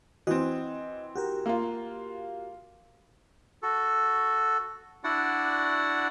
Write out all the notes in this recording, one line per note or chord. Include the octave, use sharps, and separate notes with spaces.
E3 C4 F#4 D#5
F#4 G4 A#4
A#3 F4
F#4 A4
D4 E4 F#4 D5 F#5